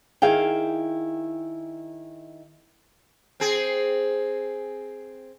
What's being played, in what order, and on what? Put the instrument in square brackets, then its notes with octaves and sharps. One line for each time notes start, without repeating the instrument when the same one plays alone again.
[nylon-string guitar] D#3 E4 G#4 F5 G5
[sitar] C4 G#4